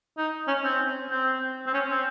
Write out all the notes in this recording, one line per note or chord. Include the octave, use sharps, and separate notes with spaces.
D#4
C#4
C4
C4
C4
C#4
C4